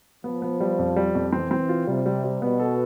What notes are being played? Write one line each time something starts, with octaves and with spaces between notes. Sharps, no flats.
F3 B3
B3
G3
F2
G3
F2
E3 C4
C4
F4
C3 G3
G3
G3
B2 B3
A4